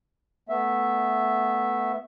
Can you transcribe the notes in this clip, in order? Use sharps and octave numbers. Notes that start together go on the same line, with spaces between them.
A3 B3 E5